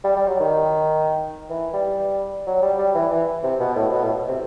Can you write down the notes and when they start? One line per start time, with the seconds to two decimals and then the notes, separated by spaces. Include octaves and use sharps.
0.04 G3
0.16 G3
0.28 F#3
0.40 D#3
1.50 E3
1.74 G3
2.47 F#3
2.62 G3
2.78 G3
2.95 E3
3.12 E3
3.43 C3
3.60 B2
3.76 A2
3.92 B2
4.04 A2
4.28 C3